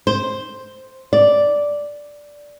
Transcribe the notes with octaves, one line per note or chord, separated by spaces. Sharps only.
C5
D5